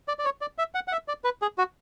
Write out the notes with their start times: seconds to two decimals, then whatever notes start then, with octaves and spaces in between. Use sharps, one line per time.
0.08 D5
0.19 D5
0.25 C#5
0.41 D5
0.58 E5
0.75 F#5
0.88 F#5
0.92 E5
1.08 D5
1.24 B4
1.42 G#4
1.58 F#4